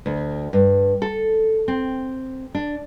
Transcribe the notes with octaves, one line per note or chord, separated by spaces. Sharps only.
D2
G2
A4
C4
D4